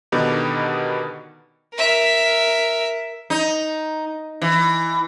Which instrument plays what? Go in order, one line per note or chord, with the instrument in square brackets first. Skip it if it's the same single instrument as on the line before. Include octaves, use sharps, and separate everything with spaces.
[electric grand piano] B2 D3 D#3 B3 D#4 G4
[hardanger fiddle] A#4 E5
[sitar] D#4
E3